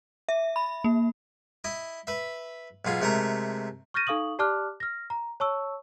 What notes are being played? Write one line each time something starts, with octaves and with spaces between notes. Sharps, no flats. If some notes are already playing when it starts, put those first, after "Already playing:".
E5
B5
A#3
E4 D#5
B4 E5
B1 B2 F4 G#4
C3 G#3 A3 A#4 A#5 C#6
C#6 F6 G6 A6 A#6 D#7
D#4 A4 F5 C#6 D#6 F#7
G4 D5 A5 D6 F6 F#6
F6 A#6
A#5
C#5 A5 C#6 E6